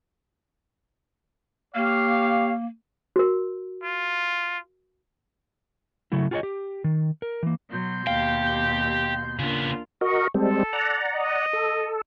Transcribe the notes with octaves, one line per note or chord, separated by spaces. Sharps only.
A#3 G4 C#5 F5
F#4 A#4
F4
C#3 F#3 A3 E4
F4 F#4 G#4 B4 C#5 D#5
G4
D#3
A#4
E3 A#3
B2 F#3 C6 G6
D#2 G4 F5 G5
C#3 A#3 B3 D4 F4
F#4 A#4 D#5 C#6
G3 G#3 C4 A4
D5 F#5 A#5
D#5
A4